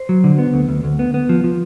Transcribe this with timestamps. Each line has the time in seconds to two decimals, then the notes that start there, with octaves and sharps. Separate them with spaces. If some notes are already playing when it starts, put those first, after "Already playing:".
Already playing: C5
0.09 F#3
0.24 D3
0.38 B3
0.54 D2
0.69 D2
0.84 D2
0.99 B3
1.14 B3
1.29 F3
1.44 F3